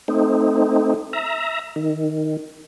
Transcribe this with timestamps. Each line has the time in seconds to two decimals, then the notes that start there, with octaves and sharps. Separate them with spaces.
0.08 A3 C4 D#4
1.13 E5 A#5
1.76 D#3